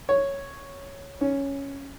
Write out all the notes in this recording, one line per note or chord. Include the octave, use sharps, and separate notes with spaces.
C#5
C#4